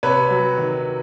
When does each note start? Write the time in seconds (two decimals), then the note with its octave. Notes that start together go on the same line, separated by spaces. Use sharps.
0.03 C3 B4 C#5
0.30 F#3
0.58 D#3